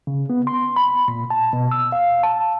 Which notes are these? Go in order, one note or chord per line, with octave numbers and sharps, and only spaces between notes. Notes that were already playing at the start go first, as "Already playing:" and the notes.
C#3
B3
C6
B5
A#2
A5
B2
E6
F5
A5